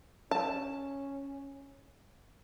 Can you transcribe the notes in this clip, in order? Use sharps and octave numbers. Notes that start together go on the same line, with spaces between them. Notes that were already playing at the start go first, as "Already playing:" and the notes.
C#4 A5